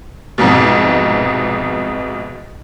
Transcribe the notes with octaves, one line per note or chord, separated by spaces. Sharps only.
C2 F2 G#2 B2